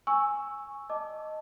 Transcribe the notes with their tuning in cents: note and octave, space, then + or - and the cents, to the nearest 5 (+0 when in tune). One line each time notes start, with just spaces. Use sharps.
G#5 -5 C#6 -5 E6 +0
D#5 +0 A5 +0 D6 +0